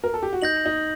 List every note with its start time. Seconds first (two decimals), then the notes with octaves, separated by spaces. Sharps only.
0.04 A#4
0.14 A4
0.23 G4
0.33 F#4
0.42 D#4 G6 A#6 F#7
0.66 D#4